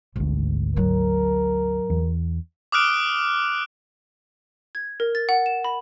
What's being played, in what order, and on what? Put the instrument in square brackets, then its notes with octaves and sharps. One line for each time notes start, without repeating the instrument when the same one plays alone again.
[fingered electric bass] G#1 D2 [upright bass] G#2
[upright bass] G#2 F#3 [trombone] A#4
[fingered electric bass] E2
[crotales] D6 D#6 F6 F#6 D7
[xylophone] G#6
A#4
A6
F#5
E7
B5